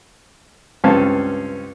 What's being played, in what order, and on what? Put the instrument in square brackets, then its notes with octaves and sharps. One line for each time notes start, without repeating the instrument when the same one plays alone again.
[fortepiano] C#2 G2 C4 C#4 F5 A5